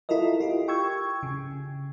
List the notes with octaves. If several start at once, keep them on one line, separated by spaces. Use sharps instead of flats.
E4 F4 A4 A#4 D#5
F4 G4
G5 C#6 E6 G#6
C#3